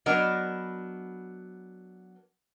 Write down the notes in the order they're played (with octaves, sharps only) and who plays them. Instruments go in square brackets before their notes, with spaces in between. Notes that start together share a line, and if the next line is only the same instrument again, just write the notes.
[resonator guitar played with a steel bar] F#3 B3 D4 A#4 D5 D#5